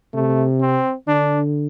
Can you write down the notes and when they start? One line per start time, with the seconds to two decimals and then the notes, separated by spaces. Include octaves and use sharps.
0.13 C3 A3
0.60 C4
1.08 D3 D4